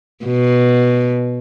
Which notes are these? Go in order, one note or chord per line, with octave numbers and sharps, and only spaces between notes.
B2